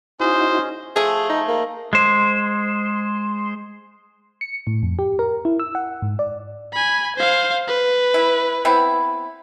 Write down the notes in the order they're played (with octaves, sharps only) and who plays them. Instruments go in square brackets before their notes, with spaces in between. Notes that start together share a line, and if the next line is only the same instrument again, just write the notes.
[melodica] C#4 G#4 D#5 [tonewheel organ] D#4 E4 F#4 [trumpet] C5
[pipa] F3 A3 [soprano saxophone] G#4
[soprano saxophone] D#4
A#3
[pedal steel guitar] G#3 C5
[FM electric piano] C#7
A2
F2
G4
A#4
E4
E6
F#5
G#2
D5
[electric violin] G#5 B5
C5 F5
B4
[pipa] E4
B3 C4 E4